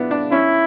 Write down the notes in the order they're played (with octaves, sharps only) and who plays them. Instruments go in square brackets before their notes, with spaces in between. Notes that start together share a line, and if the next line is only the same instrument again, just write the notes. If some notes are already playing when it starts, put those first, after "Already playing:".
Already playing: [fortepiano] B3 D4 E4
D4
[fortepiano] C#4 [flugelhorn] E4